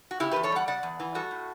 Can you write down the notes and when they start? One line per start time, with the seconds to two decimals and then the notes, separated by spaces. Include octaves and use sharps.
0.11 F#4
0.20 C#3 E4 G4
0.31 E2 G4 B4
0.43 A4 C#5
0.52 G3 D5 F#5
0.68 C#3 D5 F#5
0.83 E2
1.00 E3
1.15 G3 F#4 A4
1.31 A2